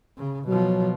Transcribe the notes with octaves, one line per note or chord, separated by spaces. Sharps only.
C#3
B2 F3 F#3